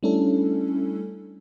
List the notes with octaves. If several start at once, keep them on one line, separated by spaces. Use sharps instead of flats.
G3 A3 C#4 D4 E4 A4